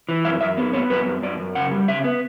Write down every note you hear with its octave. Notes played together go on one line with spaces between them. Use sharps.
E3
F#2 E5
F#2 E5
B3
B3 C#5
F#2 B4
F#2
F#2 D5
F#2
C#3 F#5
G3
C#3 E5
B3